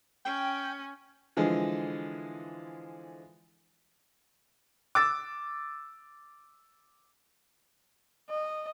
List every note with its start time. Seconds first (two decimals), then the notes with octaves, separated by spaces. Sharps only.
0.25 C#4 G5
1.37 D3 E3 F3 G#3
4.95 D6 E6 A6
8.30 D#5